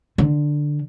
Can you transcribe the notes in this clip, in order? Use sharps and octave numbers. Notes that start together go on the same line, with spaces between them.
D3